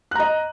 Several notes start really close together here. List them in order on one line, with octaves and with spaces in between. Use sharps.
F#6 A#5 D#5